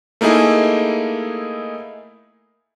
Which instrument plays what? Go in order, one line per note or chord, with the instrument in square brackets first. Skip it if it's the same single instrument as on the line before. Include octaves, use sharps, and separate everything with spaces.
[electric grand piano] A3 A#3 D#4 E4 G#4